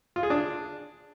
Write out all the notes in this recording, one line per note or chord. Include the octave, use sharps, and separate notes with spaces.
F4
G#4
D4